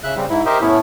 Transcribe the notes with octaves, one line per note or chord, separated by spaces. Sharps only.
C#3 E5 F#6
C#3 G3 C4
G#2 E4
G4 A#4 C5 D#5 E5
A2 A3 B3 C#4 E4